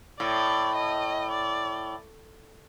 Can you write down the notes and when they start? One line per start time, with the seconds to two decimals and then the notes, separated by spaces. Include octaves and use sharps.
0.19 A2 D5
0.75 D#5
1.31 D5